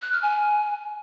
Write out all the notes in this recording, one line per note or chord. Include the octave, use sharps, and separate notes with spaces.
F#6
F6
G#5